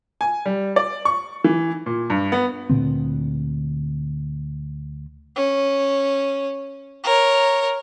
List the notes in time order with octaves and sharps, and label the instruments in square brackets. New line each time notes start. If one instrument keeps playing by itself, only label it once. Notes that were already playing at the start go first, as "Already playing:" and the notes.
[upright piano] G#5
G3
D5
C#6
E3
A#2
G2
B3
[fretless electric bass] D2 A#2 D3 C4
[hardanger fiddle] C#4
A#4 C#5